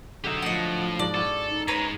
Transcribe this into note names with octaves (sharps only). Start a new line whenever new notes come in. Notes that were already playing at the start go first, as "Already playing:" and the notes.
D3 F#3 D#4 G4 E5
A2 F3 D#5 F#5
G#2 B2 D4 D5
C#4 E4 F#4 A4
D#4
G#2 G#3 B4 C#5 A#5